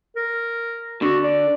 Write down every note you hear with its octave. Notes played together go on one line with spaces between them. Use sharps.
A#4
D3 F#4
D5